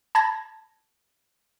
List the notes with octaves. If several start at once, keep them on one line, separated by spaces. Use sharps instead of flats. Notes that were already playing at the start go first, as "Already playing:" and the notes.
A5 B5 G#6 A#6